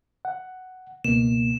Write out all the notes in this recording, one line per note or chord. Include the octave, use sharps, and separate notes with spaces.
F#5
C#2 B2 A#3 E7